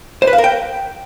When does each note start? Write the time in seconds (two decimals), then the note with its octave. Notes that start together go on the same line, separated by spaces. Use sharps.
0.22 C5
0.27 B4
0.33 F5
0.38 A#4
0.44 G5